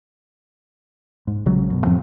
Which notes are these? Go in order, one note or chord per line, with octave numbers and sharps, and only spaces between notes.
G#2
A#1 C#3 F#3 G#3
F#2 B2
F2 A2 F3 C4